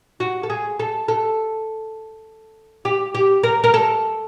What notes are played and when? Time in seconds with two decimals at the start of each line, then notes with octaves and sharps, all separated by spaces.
0.20 F#4
0.43 A4
0.50 G#4
0.79 A4
1.08 A4
2.85 G4
3.14 G4
3.43 A#4
3.64 A#4
3.74 A4